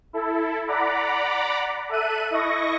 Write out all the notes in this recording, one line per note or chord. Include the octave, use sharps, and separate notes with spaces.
E4 A4
D5 F#5 A#5 B5 D6
A4 E5 F#6 D#7
E4 D#5 C#6 A#6